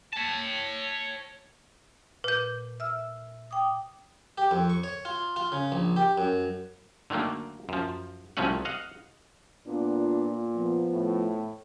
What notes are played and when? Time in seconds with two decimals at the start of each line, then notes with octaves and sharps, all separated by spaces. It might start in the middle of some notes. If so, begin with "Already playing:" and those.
0.13 C#5 A5
2.24 A#2 B4 G6
2.80 E5 E6 F6
3.51 G5 D6 D#6
4.38 G4
4.51 F2
4.70 C#6
4.84 C#5
5.05 F4
5.36 F4
5.52 C#3
5.72 A#1
5.96 G4
6.18 F#2
7.10 D3 D#3 F#3 A3 A#3
7.69 F#2 F3
8.37 C2 F3 F#3 A3 C#4 F#5
8.65 D#5 F5 F#5
9.67 A#2 B3 D4 F4
10.55 F3 B3
10.92 A2